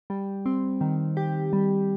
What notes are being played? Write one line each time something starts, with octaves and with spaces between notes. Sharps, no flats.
G3
C4
D#3
G4
G3